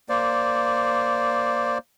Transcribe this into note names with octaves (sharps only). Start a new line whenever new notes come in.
A#3 C5 D5